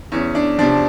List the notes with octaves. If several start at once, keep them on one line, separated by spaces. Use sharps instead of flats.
E2 C#4
D4
C3 F3 D4